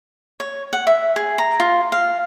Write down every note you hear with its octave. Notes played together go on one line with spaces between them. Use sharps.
C#5
F#5
E5
G#4
A#5
F4
F5